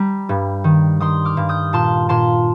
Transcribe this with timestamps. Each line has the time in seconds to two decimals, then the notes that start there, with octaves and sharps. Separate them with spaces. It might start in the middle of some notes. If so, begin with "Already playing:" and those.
Already playing: G3 A#5
0.29 G2
0.64 D#3
1.00 D#3 C6 D#6
1.25 D6 F6
1.37 G2
1.49 D#6 G6
1.73 A#2 A5 C6
2.09 A#2 A5 C6